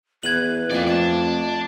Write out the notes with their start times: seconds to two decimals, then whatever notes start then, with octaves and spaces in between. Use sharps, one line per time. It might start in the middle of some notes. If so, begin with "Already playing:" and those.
0.23 E2 B4 G#6 F#7
0.70 F2 A#3 G#4 D5
0.86 A3 D5 A5